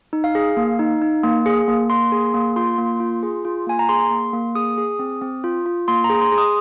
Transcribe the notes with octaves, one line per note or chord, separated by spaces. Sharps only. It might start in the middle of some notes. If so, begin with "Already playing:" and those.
D#4
F5
G#4
A#3
D#4
D#4
A#3
G#4
A#3
A#3 C6
G#4
A#3
F4 C6
A#3
F4
G#4
F4
A#3 G#5
A#5
G#4 C6
A#3
A#3
G#4 D#6
G#4
C4
C4
F4
F4
A#3 C6
A#5
G#4
C6
G#4
D#6